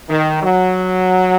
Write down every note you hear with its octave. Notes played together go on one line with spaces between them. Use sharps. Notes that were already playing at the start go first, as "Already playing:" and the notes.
D#3
F#3